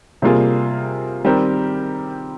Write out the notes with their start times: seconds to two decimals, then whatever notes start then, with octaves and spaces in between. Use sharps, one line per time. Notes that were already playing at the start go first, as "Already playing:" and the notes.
0.22 C3 G3 A#3 F4 G#4
1.25 D#3 G3 C4 G4 A#4